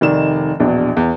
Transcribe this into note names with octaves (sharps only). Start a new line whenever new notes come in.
F1 D#3 D5 E7
A#1 E2 B2 D4
E2